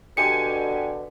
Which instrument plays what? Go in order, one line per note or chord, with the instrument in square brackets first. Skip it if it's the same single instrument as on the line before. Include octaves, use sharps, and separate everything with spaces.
[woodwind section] B2 D3 [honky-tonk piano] G4 G#5 [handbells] C#7